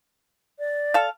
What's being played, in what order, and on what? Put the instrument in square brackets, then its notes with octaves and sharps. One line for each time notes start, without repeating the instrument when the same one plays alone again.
[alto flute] D5
[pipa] A4 F5